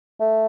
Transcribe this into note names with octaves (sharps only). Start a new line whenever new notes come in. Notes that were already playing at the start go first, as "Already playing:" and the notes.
A3